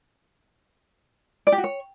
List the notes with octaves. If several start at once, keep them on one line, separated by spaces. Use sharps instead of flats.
D5
G4
F#4
C#5